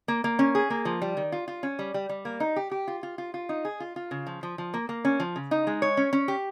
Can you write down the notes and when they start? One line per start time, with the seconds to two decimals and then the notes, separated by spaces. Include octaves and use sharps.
0.08 A#3
0.24 A#3
0.39 C#4
0.55 G#4
0.70 A#3
0.85 F3
1.02 G3
1.17 D#3
1.32 F4
1.48 F4
1.63 C#4
1.79 G3
1.94 G3
2.09 G3
2.25 A#3
2.40 D#4
2.56 G4
2.71 G4
2.88 F4
3.03 F4
3.18 F4
3.34 F4
3.49 D#4
3.65 G#4
3.80 F4
3.96 F4
4.11 C#3
4.27 F3
4.43 F3
4.58 F3
4.74 A#3
4.89 A#3
5.05 C#4
5.20 F3
5.36 C#3
5.51 D#4
5.67 G#3
5.82 C#5
5.97 C#4
6.13 C#4
6.28 G4